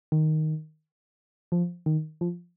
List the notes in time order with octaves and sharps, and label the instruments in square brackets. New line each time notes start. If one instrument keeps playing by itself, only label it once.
[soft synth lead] D#3
F3
D#3
F3